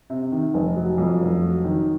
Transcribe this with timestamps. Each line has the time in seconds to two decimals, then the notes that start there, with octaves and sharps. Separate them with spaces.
0.10 C3
0.32 D#3
0.54 F1
0.76 F#3
0.98 F2
1.20 F1
1.42 F#3
1.64 D#3